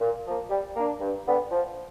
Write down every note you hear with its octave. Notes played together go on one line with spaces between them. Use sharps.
A#2
F3 A#3
G3
A#3 D4
G2
D3 G3 B3
F3